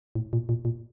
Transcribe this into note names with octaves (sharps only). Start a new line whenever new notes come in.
A2
A#2
A#2
A#2